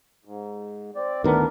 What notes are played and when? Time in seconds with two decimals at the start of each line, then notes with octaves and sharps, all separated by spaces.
0.25 G#2
0.96 C4 D5
1.24 D2 D#3 E3 B3 D4 A#4